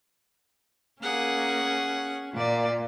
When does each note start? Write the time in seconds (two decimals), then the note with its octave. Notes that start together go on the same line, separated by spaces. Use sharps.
1.02 A#3 C#4 G#4 F#5
2.34 A#2 F4 D5